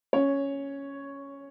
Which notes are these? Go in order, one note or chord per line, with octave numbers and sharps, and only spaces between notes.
C#4 C#5